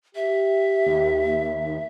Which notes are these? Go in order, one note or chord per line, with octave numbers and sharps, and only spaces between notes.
G4 E5
D#2